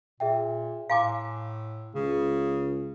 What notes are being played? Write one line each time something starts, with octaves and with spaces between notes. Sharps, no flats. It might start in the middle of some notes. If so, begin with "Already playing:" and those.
A#2 G#4 E5 G5
A2 F5 G#5 A#5 C6 D6
C#2 C#3